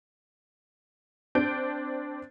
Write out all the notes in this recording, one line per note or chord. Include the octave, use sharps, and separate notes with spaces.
C4 D4 G6 D7